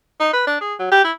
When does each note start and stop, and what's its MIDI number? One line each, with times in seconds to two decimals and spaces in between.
0.20 0.29 63
0.33 0.44 71
0.47 0.57 62
0.61 0.74 68
0.79 0.91 54
0.91 1.04 67
1.04 1.12 64